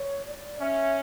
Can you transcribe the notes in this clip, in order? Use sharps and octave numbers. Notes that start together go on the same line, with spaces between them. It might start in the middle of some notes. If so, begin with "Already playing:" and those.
Already playing: C#5
D5
C#4 E5